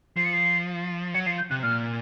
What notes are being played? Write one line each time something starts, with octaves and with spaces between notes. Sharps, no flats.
F3 C7
C#7
C7
F#3 C#7
F3 C7
G6
C3 F#6
A#2 F6